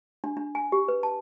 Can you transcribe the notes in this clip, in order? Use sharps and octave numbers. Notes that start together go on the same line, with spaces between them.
D4
D4
G#5
G4
B4
A5